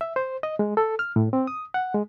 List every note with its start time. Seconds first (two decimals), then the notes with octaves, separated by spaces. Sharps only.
0.01 E5
0.16 C5
0.43 D#5
0.59 G#3
0.77 A4
0.99 F6
1.16 A2
1.33 C4
1.47 D#6
1.74 F#5
1.95 G#3